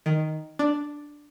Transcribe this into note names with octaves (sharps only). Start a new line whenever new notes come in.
D#3
D4